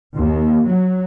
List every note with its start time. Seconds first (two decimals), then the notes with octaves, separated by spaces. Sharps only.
0.15 D#2
0.66 F#3